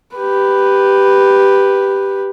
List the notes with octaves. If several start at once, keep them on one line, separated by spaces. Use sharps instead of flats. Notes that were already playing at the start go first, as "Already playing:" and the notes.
G4 B4